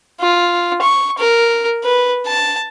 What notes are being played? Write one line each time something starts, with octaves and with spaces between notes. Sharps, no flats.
F4
C#6
A#4
B4
A5